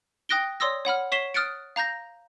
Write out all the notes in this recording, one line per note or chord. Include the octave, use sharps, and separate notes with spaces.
G5 D#6 F#6 A#6 D7 G7
C#5 D5 C6 D#6 E6 A#6
C#5 F#5 B5 F6
C#5 C#6 B6 C7 E7 G7
D#6 F6 F#6 A6 C#7 D7
F5 A#5 G6 A#6